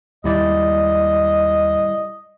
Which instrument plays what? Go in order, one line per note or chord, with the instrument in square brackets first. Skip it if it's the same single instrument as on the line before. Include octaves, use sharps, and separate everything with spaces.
[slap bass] D#2 G#2 [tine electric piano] G3 E4 D5 [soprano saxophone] D#5